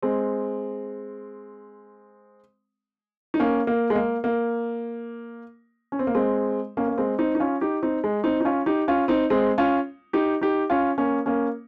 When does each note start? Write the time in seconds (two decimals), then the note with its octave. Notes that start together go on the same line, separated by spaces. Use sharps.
0.02 G#3 C4
3.34 D#4
3.40 A#3 C#4
3.67 A#3
3.90 G#3
3.95 A#3
4.24 A#3
5.92 C#4
5.99 C4
6.07 A#3
6.15 G#3 C4
6.77 A#3 C#4
6.88 A#3
6.98 G#3 C4
7.18 C4 D#4
7.35 D#4
7.40 C#4 F4
7.61 D#4 G4
7.82 C4 D#4
8.04 G#3
8.24 C4 D#4
8.41 D#4
8.45 C#4 F4
8.66 D#4 G4
8.88 C#4 F4
9.08 C4 D#4
9.30 G#3 C4
9.58 C#4 F4
10.13 D#4 G4
10.41 D#4 G4
10.70 C#4 F4
10.98 A#3 C#4
11.26 A#3 C#4